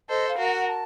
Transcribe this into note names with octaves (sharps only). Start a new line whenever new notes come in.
A4 C5 D#5
F5
F#4 A#4
F#5
A5